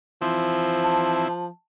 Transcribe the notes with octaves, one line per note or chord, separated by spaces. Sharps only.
E3 F3 C4 E4
A5